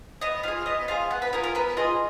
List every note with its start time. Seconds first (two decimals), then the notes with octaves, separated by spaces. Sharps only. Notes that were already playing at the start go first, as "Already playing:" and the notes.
0.21 B3 D#5
0.43 F4 G#4 F5
0.66 B3 D#5
0.88 F4 G#4 F5
1.10 B3 F#5
1.22 B4
1.33 F4 G#4 A#4
1.44 A#4
1.55 B3 B4
1.77 F4 G#4 D#5